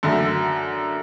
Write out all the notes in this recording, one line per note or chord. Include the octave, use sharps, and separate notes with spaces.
F#2 D3 A3